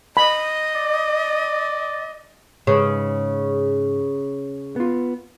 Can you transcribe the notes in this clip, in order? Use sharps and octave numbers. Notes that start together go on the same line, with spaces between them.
D#5 B5
D5
G#2 C#3 B4 A5
B3 F4